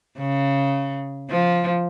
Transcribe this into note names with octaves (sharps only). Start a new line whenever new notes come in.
C#3
F3